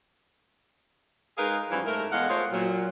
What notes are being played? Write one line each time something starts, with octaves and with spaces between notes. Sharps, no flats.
G#3 D#4 G#4 A#4 B4 F5
F#2 E3 F3 G3
G#2 A3 E4 A#4
E2 G#3 A3 D#5 F5 F#5
A3 F4 G#4 A#4 C5 C#5
A#2 F#3